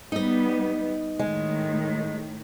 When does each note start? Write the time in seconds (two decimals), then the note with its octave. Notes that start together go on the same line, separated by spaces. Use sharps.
0.12 G3 B3 D#4 D#5
1.19 A2 D#3 G#3